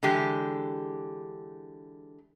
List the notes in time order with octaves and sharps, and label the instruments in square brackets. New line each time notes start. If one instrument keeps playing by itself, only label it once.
[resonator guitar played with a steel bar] D3 E3 G#3 G4